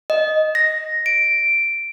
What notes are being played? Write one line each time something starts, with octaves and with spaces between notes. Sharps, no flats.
D#5
A#6
D7